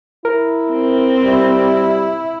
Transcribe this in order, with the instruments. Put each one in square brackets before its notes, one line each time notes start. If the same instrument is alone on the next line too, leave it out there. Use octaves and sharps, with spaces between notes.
[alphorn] E4 [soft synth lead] A#4
[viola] C4
[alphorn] G3 [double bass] E4